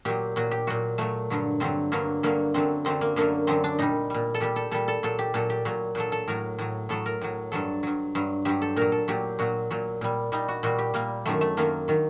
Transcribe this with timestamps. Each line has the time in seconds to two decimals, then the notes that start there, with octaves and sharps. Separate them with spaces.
0.05 A#2 F#3 G4
0.36 A#2 F#3 F#4
0.51 G4
0.67 A#2 F#3 F#4
0.98 A#2 F#3 A3
1.30 G2 D3 F#3
1.60 G2 D3 F#3 C4
1.92 G2 D3 F#3 A#3
2.23 G2 D3 F#3 A#3
2.54 F#2 D3 F#3 C4
2.85 F#2 D3 F#3 C4
3.01 A#3
3.16 F#2 D3 F#3 A#3
3.47 F#2 D3 F#3 C4
3.64 D4
3.79 A#2 G3 D#4
4.10 A#2 G3
4.34 A4
4.40 A#2 G3 G4
4.56 A4
4.71 A#2 G3 A4
4.88 A4
5.03 A#2 F#3 A4
5.19 G4
5.34 A#2 F#3 A4
5.50 G4
5.65 A#2 F#3
5.95 A#2 F#3 A4
6.12 A4
6.28 A2 F#3 A#4
6.58 A2 F#3
6.89 A2 F#3 A4
7.06 A#4
7.21 A2 F#3
7.52 G2 F#3 A4
7.83 G2 F#3
8.15 G2 F#3
8.45 G2 F#3 G4
8.62 A4
8.76 A#2 F#3 A#4
8.92 A4
9.08 A#2 F#3 G4
9.39 A#2 F#3 F#4
9.70 A#2 F#3
10.01 A#2 G3
10.32 A#2 G3 D#4
10.48 F#4
10.63 A#2 G3 F#4
10.79 G4
10.94 A#2 G3 A#3
11.25 F#2 D#3 F#3 A3
11.41 A3
11.57 F#2 D#3 F#3 A#3
11.88 D#3 F#3